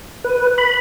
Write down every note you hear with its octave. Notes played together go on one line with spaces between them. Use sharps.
B4
B5